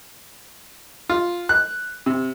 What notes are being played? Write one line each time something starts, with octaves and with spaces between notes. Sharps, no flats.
F4
F#6
C3